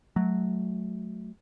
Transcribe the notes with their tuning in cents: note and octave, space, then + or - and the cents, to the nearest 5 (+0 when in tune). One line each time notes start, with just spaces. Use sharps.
F#3 +0 A3 -25